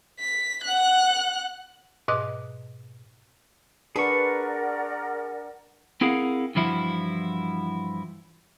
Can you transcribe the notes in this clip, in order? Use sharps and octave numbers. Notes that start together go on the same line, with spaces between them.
B6
F#5 F#6
G#2 B2 D#5 D6 F#6
D4 G#4 A#4 B4 D5 F#5 C#6
C4 E4 G#4 A#4 F5 F#5
G2 E3 F3 E4 F#4